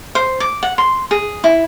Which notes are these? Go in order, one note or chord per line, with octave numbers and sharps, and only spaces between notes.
C5
D6
F#5
C6
G#4
E4